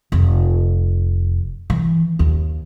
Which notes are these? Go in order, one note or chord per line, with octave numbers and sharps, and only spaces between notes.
F1
E3
D#2